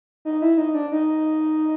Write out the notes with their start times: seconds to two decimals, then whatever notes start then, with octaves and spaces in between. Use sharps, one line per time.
0.25 D#4
0.42 E4
0.58 D#4
0.74 D4
0.92 D#4